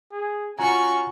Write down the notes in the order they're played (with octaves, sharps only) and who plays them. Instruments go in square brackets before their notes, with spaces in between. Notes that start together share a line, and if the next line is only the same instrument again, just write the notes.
[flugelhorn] G#4
[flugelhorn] C#4 [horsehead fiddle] F4 [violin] F#4 C#6 [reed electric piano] G#5 A#5